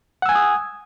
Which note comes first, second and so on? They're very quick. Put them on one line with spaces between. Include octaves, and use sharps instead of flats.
F#5 E6 G#5 G#6 D#6